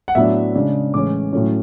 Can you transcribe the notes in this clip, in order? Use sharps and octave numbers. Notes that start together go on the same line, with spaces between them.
F#5
A2 F#3 B3 D4 E5
C#3 G#3 D4
A2 E3 G#3 C#4 D6
A2 F#3 A3 C#4